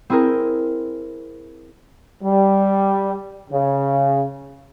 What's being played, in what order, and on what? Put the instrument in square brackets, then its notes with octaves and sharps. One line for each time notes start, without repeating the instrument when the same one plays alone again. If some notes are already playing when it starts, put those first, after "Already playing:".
[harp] C4 E4 G#4 A#4 C5
[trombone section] G3
C#3